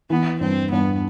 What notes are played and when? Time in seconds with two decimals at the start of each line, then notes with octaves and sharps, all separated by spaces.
0.10 E3 B3
0.41 G2 C4
0.71 G2 B3